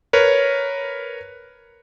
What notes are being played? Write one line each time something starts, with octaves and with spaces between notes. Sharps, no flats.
A#4 B4 C#5